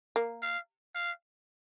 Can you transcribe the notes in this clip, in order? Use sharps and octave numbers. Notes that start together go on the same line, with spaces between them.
A#3
F5
F5